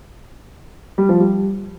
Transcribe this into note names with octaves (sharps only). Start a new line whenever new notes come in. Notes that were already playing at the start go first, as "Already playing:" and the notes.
G3
F3
G3